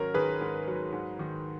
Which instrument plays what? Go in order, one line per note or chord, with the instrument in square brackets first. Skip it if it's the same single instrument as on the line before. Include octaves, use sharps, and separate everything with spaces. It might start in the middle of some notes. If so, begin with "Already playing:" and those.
Already playing: [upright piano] G#2 D#3 F#3 C#4 [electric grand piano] A#4
[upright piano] D#3 [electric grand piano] G#4 B4
[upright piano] G#2
F#3
G#2
D#3